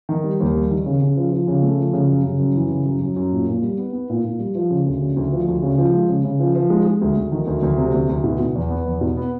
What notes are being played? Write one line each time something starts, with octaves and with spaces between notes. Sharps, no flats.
D#3
G3
D#2
G3
D#3
C#3
C#3
F3
F3
C#3
A3
F3
C#3
F#2
C#3
F#2
E3
C#3
F#2
F#2
F#2
A#2
A#2
G3
B3
B3
A#2
A#2
G3
F3
C#3
D2
C#3
D2
F3
D2
C#3
F3
G#3
C#3
C#3
F3
F3
G#3
G#3
D2
D2
D#3
D2
D2
C3
D2
D2
B2
B2
E2
B3
E2
B2
B3